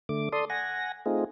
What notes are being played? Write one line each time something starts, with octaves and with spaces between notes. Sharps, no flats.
D3 A3 D6
A4 D5 C6 D#6
F#5 G#5 A#6
A3 C4 D#4 F4 G#4